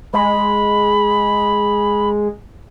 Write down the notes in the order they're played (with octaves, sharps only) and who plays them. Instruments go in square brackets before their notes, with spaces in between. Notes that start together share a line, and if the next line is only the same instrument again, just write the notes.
[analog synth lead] G#3 [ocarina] B5